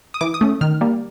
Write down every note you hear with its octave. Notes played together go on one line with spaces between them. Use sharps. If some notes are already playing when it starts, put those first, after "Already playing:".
D#6
E3 D6
D#6
A3 C#4
D#3 F6
G3 A#3